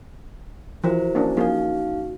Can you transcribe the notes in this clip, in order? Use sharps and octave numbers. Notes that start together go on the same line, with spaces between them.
E3 F3 E4 F#4 A#4 C5
A#3 C#4 D4
F3 A#3 D#4 G#4 F5